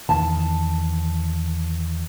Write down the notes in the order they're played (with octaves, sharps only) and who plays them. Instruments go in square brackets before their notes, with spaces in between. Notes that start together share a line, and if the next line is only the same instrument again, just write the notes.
[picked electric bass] E2 D#3 [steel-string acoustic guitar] A5